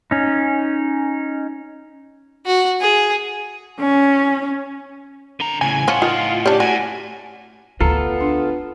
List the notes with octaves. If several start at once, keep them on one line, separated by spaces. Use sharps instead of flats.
C#4 D#4
F#4
G#4
C#4
D3 A#5
A2 C#3 G#5
A2 F3 C#4 F#5
D#3 F4
C#4 D4 G4
A2 F#4 G#5
D2 B3 F4 A4 A#5
D4